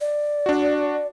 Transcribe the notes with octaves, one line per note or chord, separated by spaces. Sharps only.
D5
D4 F#4